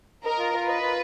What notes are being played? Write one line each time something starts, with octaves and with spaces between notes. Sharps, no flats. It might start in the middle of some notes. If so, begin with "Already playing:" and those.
A#4 D#5
F4
F4
B4 D#5
F4